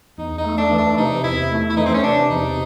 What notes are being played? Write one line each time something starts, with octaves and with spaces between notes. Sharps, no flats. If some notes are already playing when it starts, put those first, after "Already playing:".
E2 D#4
D#4
A3
D4
E3
D4
C3 D#4
E2 E4
A3
E4
E3 D#4
C4
C#4
C3 D4
E2 D#4